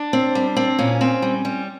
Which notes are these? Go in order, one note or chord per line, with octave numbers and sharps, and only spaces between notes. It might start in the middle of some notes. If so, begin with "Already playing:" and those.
Already playing: D4
C4
G3
C4
A#2 C#4
C4
G3
G3